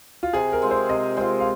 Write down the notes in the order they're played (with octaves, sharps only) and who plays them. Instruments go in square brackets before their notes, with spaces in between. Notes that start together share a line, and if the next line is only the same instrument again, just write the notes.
[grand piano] F4
[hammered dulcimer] C3 [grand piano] G#4
[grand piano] A#4
[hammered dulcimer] G#3 C4 F4
[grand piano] C5
[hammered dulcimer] C3 [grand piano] D#5
[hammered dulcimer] G#3 C4 F4 [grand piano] C5
[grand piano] F5